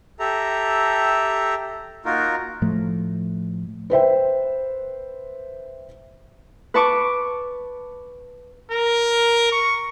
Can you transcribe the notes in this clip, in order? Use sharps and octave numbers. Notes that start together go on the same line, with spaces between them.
G4 A4 E5 A#5
A#3 D#4 F4 F#4 A#4
A2 F3 A3
B4 C5 E5 G5
B4 A5 C#6 D6
A#4
C#6